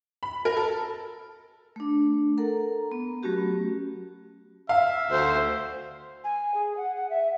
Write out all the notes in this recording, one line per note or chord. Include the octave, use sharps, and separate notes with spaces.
B5
A#4
A4
A3 D4
A4 A#4 F#5 A#5
B3
F#3 A3 C#4 F#4 G4
E5 F5
D2 C5
G#5
G#4
F#5
F#5
E5